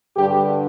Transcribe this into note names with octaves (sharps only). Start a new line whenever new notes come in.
G2 D3 G3 G4